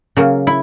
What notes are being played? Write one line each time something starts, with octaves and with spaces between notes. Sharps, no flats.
C#3 F#3 A#3
E4